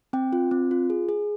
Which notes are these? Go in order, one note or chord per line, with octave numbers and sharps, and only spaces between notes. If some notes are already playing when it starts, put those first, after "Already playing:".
C4 G5
F4
C4
F4
G#4
G#4